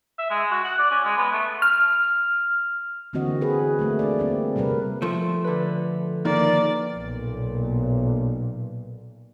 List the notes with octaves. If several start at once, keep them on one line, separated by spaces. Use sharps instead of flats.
E5
G#3
F#4
F#5
D5
C#4
G#3
B3
A3
F6
D3 E3 A#3 C4 F#4 D#5
G#4 B4
A3 A#3
D4 D5
G3 A#3 C4
C3 G3 A#4 B4
F3 A3
D3 B4
D#3 A#3 D5
B1 A#2